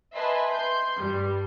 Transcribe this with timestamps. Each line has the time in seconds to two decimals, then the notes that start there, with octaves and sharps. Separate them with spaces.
0.13 B4 D#5 E5 G#5 A5 C6
0.51 C6 G6
0.98 G2 G3